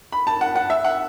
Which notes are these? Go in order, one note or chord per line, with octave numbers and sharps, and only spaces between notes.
B5
A5
F#5
F#5
E5
F#5